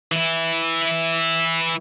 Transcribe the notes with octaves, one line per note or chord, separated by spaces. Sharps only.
E3 E4